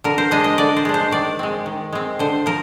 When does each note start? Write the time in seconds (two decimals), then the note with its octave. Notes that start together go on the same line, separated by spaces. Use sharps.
0.04 D3 A#4
0.18 C5
0.31 G#3 D4 D#5
0.44 D#5
0.58 D3 D5
0.77 C5
0.85 G#3 D4
0.94 C5
1.11 D#3 D5
1.39 G#3 C4
1.66 D#3
1.93 G#3 C4
2.19 D3 C5
2.46 F3 A#4